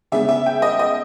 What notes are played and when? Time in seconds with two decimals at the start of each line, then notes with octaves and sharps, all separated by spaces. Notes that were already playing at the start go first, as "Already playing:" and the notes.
0.12 C#3 G#3 B3 E5
0.29 E5
0.46 G5
0.62 D#5
0.79 D#5